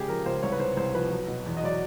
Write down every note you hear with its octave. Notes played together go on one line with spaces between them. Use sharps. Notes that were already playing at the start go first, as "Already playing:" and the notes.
Already playing: C#3 G#3 G4 G#4
F3 A#4
C#2 C5
C2 C#5
B4
C3 C5
C2 C5
F3 B4
F#3
B2
E2
D#5
F#3 D5